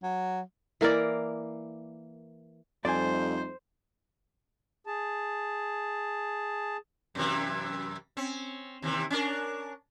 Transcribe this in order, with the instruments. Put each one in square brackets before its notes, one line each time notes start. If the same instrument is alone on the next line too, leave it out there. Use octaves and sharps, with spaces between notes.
[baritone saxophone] F#3
[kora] E3 A#3 A#4 D5
[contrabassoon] F2 [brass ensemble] G3 A3 D#4 [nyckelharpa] C5 [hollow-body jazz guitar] D5 G#5
[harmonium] G#4 A5
[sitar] F#2 C3 E3
C4 C#4
D#2 C3 E3
C#4 D4 A#4